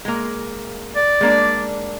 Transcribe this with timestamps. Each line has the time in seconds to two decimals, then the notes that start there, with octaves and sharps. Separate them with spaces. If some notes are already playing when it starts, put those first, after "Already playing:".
0.05 G#3 A#3
0.96 D5
1.21 G#3 A#3 D4